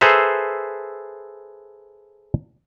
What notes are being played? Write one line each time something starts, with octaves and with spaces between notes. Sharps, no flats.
G#4 A4 B4 C5 E5 A#5